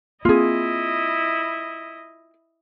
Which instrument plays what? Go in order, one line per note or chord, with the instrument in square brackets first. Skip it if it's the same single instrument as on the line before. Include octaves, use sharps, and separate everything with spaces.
[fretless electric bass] A#3 C4 [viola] E4 D#5 [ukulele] F4 G#4